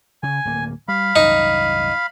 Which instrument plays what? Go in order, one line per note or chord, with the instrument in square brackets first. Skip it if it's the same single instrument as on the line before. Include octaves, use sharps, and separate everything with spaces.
[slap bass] C#3 [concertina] G#5
[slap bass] D1 A#3
[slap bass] G3 [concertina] F5 B5
[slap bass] C2 F#2 [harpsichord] D#4